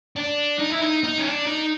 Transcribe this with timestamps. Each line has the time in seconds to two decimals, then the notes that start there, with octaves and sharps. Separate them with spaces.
0.16 D4
0.59 D#4
0.71 E4
0.80 D#4
1.04 D#4
1.18 C#4
1.24 D4
1.47 D#4